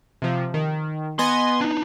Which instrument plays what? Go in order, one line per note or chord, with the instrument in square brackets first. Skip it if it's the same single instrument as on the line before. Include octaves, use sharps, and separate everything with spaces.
[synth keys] C3 F3
D#3
[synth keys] B3 D#5 G#5 [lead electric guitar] C6
[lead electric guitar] D4 D#4